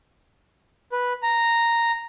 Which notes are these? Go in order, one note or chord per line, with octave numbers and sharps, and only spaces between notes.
B4
A#5